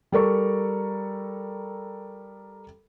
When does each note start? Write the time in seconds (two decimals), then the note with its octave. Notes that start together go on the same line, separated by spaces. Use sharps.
0.12 G3 A4 A#4 C#6